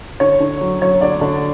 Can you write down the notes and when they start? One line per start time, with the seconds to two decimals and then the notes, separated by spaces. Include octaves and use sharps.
0.20 D3 C#5
0.40 D3
0.61 F#3
0.81 F#3 C#5
1.01 D3 D5
1.21 D3